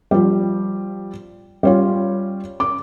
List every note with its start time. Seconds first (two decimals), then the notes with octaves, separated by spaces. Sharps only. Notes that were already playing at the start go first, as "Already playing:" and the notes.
0.11 F3 G3
1.63 G3 C#4 F4
2.60 D6